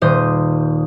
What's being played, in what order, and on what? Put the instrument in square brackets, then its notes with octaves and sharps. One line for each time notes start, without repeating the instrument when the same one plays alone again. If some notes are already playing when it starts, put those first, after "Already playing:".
[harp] D#1 C5 D#6